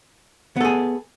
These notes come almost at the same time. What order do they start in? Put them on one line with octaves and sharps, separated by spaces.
B3 A4 G#4